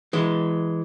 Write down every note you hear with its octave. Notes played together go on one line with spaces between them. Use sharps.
E3 G#3